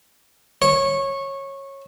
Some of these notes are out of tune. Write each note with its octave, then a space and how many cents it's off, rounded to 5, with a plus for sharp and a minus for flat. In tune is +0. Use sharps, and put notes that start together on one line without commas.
C#5 -15